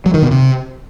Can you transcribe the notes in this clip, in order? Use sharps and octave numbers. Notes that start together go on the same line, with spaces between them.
F#3
D#3
B2
C3